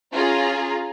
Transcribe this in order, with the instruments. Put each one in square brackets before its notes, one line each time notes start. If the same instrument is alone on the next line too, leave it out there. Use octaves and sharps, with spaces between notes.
[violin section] C#4 F4 G#4 A#5